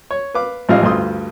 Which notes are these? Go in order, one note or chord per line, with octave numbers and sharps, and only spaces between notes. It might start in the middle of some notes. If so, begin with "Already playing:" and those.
C#5
B4 F5 D6
A1 G#2 F3 G3 D#5 F5
D2 G2 F4 A4 C6 D#6